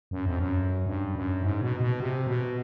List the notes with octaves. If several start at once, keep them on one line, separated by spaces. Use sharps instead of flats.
F#2
F2
F#2
G2
F#2
G#2
B2
B2
C3
B2